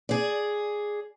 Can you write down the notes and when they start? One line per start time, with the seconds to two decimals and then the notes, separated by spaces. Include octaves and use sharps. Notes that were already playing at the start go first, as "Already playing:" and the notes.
0.09 G#4 D5